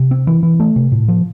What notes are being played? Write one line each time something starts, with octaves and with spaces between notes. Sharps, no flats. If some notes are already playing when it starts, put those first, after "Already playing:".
Already playing: C3
C4
E3
E3
A3
C3
A2
F3